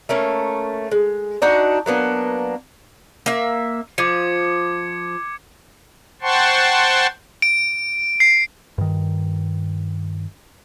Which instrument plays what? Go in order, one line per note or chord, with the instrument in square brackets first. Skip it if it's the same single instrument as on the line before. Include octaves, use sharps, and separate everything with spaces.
[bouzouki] A3 A#3 C#4
G#3
D4 D#4 F#4 F#5
F#3 A#3 B3 D4
A#3 E5
[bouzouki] F3 [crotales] D6 G#6 C#7
[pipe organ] C5 F#5 G5 A5 C6 C#6
[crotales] D7
C7
[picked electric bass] G2 D#3